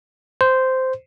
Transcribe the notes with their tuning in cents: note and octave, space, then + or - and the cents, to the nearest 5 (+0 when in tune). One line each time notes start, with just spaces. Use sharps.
C5 -10